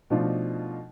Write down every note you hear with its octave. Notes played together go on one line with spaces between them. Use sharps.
B2 F3 A3 D4 D#4 F4